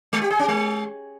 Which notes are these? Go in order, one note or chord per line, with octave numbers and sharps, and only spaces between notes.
G#3
G4
G#4
C#4
G#3